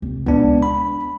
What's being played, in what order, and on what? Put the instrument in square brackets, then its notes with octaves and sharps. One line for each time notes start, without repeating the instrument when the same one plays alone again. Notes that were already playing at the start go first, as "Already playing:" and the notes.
[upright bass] C2
[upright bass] C#2 A#2 [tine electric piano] B3 D4
[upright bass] G#3
[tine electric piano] B5